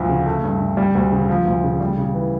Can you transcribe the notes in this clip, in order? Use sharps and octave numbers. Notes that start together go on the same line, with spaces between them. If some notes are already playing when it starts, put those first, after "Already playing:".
Already playing: D2 F3
C#3
A3
G2
D3
G3
D2
C#3
F3
D2
C#3
G3
C#3
E3